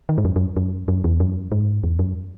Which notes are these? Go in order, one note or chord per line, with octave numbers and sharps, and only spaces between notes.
D#3
G#2
F#2
F#2
F#2
F#2
E2
F#2
G#2
E2
F#2